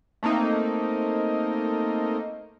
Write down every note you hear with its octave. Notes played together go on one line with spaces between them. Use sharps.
A3 A#3 C4 D#4